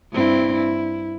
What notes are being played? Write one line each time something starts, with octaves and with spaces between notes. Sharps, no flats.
G2 C4 E4
E4